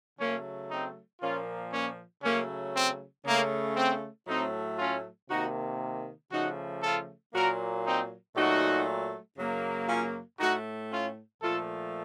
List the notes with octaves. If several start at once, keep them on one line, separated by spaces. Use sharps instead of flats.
C#3 F#3 A3 A#3 C#4
C4 D#4
A#2 F3 A#3 C#4 F4
A#3 C#4
C#3 F#3 A3 A#3 C#4
C4
C#3 A3 A#3
C4
A2 F#3 A3 C4 D#4
C#4 F4
C3 D#3 A#3 D#4 F#4
C#3 F3 A3 D#4 F#4
F4 A4
A#2 F#3 A#3 F#4 A#4
C4 D#4
A#2 F#3 A3 D#4 F#4
F#2 C#3 F#3 A#3
C#4 F4
A2 A3 D#4 F#4
C#4 F4
A#2 F3 A3 F4 A4